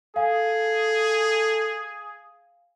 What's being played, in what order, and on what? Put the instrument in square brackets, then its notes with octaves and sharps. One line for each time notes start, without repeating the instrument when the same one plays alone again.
[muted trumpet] G#4 [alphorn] A4 [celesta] F5 G#5